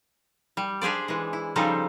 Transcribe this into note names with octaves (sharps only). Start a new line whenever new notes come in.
G3
D4 G4 G#4 C5 D5
E3 G#3
E4
C#3 F3 G3 D#4 A4 C5